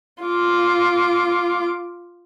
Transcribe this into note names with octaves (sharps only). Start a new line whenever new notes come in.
F4 D6